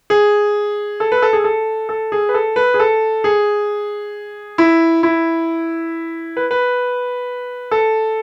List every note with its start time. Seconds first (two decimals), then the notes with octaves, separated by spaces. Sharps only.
0.10 G#4
1.00 A4
1.12 B4
1.22 A4
1.33 G#4
1.44 A4
1.89 A4
2.12 G#4
2.29 B4
2.34 A4
2.56 B4
2.74 G#4
2.80 A4
3.24 G#4
4.58 E4
5.03 E4
6.37 B4
6.51 B4
7.71 A4